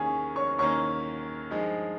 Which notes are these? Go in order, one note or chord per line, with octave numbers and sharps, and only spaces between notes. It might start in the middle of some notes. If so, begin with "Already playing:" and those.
Already playing: D#2 D#3 A#3 C#4 G#4 G#5
C#5 C#6
D#2 D#3 A#3 C#4 C#5 C#6
G2 F3 G#3 D#4 G#4